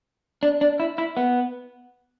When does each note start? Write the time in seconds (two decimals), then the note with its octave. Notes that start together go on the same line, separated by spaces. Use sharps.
0.43 D4
0.61 D4
0.80 E4
0.98 E4
1.17 B3